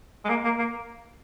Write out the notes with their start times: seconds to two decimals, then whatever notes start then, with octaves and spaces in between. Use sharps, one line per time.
0.25 G#3
0.29 A#3
0.44 A#3
0.59 A#3